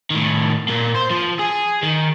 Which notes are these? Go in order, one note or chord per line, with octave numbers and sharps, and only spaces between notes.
A2 D#3
A#2 A#3
C5
F3
G#4
D#3